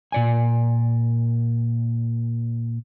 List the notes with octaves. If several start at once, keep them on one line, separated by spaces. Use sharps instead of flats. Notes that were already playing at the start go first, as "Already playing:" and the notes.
A#2 D5 G#5